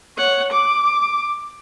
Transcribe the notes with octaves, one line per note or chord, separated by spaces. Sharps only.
C#5 F#5
D6